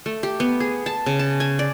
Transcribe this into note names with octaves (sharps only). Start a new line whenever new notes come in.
A3
G4
B3
G#4
A5
C#3
A5
G#5
D5